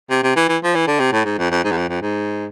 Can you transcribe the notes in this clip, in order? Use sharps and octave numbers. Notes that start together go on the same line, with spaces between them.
C3
C3
E3
E3
F3
E3
D3
C3
A2
G#2
F2
F2
G#2
E2
F2
F2
G#2